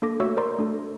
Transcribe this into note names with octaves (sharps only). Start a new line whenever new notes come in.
A#3 D4 A4 D6 A#6
A3 F#4 C#5 E5 C#6 E6
A#4 C5 D5 A#5 C6
A3 D4 A4